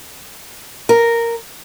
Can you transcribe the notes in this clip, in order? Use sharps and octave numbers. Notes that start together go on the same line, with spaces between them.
A#4